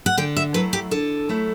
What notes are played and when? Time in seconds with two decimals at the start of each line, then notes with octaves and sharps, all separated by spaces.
0.06 F#5
0.17 D3 G5
0.36 E5
0.54 F#3 A3 E4 B4
0.73 G4
0.91 D3 A4
1.29 F#3 A3 E4